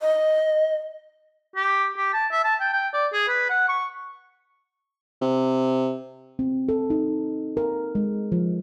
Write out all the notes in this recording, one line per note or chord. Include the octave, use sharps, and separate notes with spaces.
D#5
G4
G4
A5
E5
A5
G5
G5
D5
G#4
B4
F#5
C#6
C3
C4
A4
D#4
A#4
G#3
F3